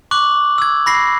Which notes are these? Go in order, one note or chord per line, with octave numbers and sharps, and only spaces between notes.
C#6 D6 F#6 F#7
E6 G#6
B5 A#6 C7